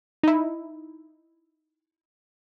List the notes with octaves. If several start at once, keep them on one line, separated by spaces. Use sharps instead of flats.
D#4 E4